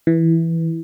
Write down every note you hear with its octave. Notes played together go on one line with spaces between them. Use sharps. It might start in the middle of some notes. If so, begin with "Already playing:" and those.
E3